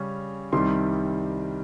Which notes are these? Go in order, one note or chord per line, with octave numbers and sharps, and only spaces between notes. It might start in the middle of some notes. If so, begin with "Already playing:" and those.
Already playing: C#3 G3 C#4
C2 C3 D#3 G3 C6